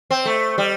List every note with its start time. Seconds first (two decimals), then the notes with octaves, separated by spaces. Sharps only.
0.11 C4
0.25 A3
0.58 G3